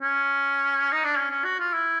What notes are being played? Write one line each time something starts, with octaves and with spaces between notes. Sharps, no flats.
C#4
D#4
D4
C#4
C#4
F#4
F4
E4